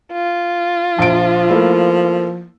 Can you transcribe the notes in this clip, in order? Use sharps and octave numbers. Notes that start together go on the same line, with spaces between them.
F4
A#1 F3 D7
A3 A#3 E4